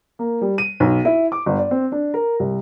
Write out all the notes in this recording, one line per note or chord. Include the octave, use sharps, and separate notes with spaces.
A#3
G3
D#7
B1
E4
D6
G1
D5
C4
D4
A#4
C2